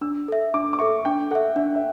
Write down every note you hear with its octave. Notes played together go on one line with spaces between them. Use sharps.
D4 E6
A4 E5
D4 D6
D6
A4 E5 C#6
D4 G5
A4 E5 F#5
D4 E5
E5